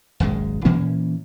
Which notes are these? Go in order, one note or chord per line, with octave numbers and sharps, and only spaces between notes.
D#1 G#1 F#2 G#3
A#2 E3 A#3 C#4